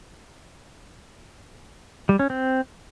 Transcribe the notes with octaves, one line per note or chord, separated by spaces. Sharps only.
G3
C#4
C4